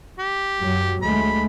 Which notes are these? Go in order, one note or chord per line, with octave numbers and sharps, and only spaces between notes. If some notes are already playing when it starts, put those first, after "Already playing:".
G4
F#2 F#3
D2 G#3 A3 B5